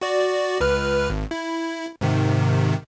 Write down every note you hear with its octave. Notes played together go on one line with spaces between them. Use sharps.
F#4 D5
C#2 B4 F6
G#1
E4
G#2 C3 D#3